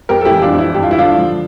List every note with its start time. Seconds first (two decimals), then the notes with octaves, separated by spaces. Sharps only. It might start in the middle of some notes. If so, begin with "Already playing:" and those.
0.09 F2 G4 A#4
0.21 A4
0.25 E4 G4
0.31 E3
0.42 D4 F4
0.53 F2
0.59 E4
0.75 G2 G4
0.83 F4
0.91 E4
0.97 D3 D4 F4
1.18 F3